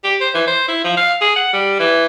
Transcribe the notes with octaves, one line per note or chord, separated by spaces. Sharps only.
G4
C5
E3
C5
E4
F3
F5
G#4
F#5
G3
E3